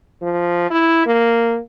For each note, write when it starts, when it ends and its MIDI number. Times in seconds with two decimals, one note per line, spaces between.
0.22 0.69 53
0.70 1.04 64
1.06 1.59 58